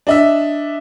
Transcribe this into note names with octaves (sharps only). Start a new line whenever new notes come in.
D4 D#5 E5